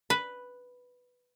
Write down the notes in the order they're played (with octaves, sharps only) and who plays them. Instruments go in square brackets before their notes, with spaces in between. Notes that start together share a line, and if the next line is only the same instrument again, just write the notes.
[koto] B4